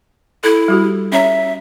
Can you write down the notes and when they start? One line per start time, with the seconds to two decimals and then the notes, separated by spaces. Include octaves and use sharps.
0.44 E4 A4
0.68 G3 F#4 G4
1.12 C#4 C#5 E5 A#5